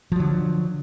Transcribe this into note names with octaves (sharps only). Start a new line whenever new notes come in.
D3 F3 F#3